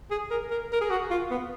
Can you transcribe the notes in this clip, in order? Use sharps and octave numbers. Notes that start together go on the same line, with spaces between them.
G#4
A#4
A#4
A#4
G#4
F#4
F4
B3